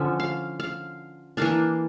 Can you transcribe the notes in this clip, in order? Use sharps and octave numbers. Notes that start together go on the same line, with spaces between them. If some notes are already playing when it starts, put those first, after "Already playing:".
Already playing: D3 F3 C#4 E5
F5
F5
E3 A#3 D4 F5